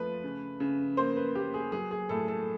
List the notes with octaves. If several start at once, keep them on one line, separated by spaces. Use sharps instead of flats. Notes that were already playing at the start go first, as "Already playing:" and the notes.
Already playing: F3 A3 B4
C#3
C#3
A#3 C5
B4
A#3 G4
G#4
F#3 G#4
G#4
A2 A4
A4